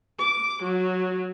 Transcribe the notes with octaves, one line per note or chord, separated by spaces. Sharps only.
D6
F#3